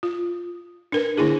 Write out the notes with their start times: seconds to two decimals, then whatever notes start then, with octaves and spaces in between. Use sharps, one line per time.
0.03 F4
0.92 D4 A#4 B4
1.17 D3 A#3 D4 E4 G#4